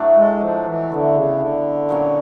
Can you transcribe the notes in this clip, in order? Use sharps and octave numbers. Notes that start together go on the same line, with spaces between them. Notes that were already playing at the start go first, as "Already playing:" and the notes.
Already playing: A2 F#3 A3 D4
G#3
F3
E3
D3 B3 E4 A4
C#3
D3
A#2 F#3 A#3 C#4